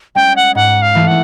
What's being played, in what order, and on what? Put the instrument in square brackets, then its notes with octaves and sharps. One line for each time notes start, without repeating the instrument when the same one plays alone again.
[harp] G#3 C#4 [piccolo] G5
[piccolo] F#5
[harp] G#2 [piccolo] F#5
[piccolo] F5
[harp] E3 A3
[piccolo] F#5